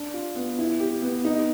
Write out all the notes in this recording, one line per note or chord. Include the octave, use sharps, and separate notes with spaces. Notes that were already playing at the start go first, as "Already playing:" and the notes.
Already playing: D4
F4
B3
E4
G4
B3
D#4